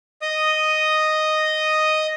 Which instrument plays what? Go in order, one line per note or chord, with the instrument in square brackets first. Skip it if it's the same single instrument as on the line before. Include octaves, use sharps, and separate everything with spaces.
[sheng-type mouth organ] D#5 D#6